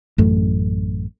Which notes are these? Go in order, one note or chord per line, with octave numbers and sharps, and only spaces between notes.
A1 F#2 A3